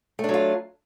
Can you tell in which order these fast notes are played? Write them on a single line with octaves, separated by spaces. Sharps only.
A3 D4 F#3 F4